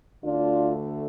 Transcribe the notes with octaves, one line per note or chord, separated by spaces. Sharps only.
D2 D3 A3 D4 F4